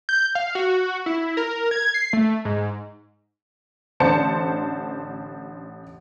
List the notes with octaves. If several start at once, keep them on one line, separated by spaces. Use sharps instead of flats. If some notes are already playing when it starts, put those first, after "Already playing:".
G6
F5
F#4
E4
A#4
G#6
C7
A3
G#2
A1 D3 C5 D5 A5 C#7